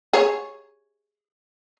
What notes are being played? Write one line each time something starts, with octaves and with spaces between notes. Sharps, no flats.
G#4 C#5